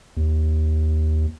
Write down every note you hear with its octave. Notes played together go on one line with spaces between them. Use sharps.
D#2